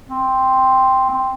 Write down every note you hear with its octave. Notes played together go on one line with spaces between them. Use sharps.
C4
C4